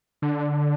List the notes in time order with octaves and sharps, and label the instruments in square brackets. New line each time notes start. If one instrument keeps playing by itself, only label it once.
[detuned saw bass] D3